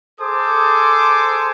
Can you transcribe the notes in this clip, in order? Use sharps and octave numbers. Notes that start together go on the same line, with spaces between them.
G#4 A4 C5 D6